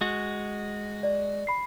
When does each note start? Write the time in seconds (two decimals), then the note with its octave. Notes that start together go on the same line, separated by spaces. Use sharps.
0.01 G#3 F#4
1.03 D5
1.47 B5 C7